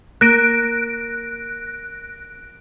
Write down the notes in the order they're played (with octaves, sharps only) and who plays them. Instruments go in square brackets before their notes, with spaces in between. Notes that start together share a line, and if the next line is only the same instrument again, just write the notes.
[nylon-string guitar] A#3 [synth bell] F#6 A#6 D7